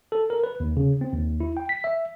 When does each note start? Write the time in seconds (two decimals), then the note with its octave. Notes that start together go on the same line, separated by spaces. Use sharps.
0.12 A4
0.30 A#4
0.44 B4
0.60 D#2
0.77 C#3
1.01 C4
1.13 D#2
1.40 E4
1.57 G5
1.69 B6
1.84 E5